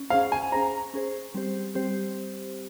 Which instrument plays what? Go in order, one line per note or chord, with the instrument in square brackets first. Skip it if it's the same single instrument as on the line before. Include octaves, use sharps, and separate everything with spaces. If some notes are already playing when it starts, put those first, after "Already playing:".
Already playing: [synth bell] C#4
[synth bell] C#4 G#4 C5 [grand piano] F5
[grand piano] G#5
[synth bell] C#4 G#4 C5 [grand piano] A#5
[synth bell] C#4 G#4 C5
G3 C4 G4 C5
G3 C4 G4 C5